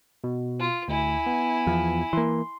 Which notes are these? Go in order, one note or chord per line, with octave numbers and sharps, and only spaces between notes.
B2
F4
D2 E4 G#5
B3
E2 F3
E3 A#3 C6